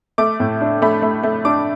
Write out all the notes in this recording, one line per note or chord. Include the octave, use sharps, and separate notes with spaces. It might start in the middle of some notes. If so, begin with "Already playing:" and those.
A3 D6
A2
D4
A3 B5
A3
A3
D4 D6